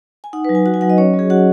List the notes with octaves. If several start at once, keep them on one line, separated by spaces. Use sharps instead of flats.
G#5
D#4 F#5
B4
F#3
G#5
F#4 F#5
G#5
F#3 F#5
D#5
C#4 C#5
F#3
G#4
F#4 F#5